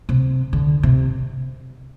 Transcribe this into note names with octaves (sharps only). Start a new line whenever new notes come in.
C3
D3
C3